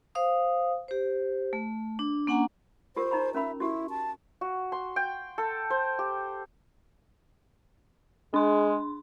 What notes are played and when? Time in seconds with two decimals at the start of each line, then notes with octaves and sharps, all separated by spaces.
0.15 C5 F5 D#6
0.88 G4 C5
1.53 A3
1.99 D4
2.27 A#3 C#4 D4 F#5 G#5 A#5
2.96 F4 G4 A#4 C5
3.11 D#4 A#5 B5
3.34 C#4 A#4 E5 B5
3.60 E4 F#4 G4
3.90 A5
4.41 F#4
4.72 C6
4.96 G5
5.38 A4
5.70 C5
5.99 G4
8.34 G#3 D4 C6